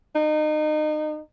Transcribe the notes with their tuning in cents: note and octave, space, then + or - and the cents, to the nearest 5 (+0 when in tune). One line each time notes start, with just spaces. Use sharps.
D#4 -30